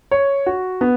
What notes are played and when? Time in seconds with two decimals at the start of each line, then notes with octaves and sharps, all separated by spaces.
0.11 C#5
0.46 F#4
0.81 B3